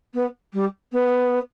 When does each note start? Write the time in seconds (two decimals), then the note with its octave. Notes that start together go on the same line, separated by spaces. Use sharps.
0.13 B3
0.52 G3
0.92 B3